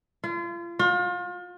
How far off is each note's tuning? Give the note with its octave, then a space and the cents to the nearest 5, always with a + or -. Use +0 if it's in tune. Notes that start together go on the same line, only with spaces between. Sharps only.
F4 -35
F4 +35